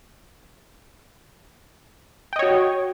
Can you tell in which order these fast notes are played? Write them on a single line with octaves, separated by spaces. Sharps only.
G5 D#5 C#5 F#4